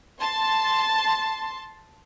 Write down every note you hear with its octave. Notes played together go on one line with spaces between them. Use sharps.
A5 C6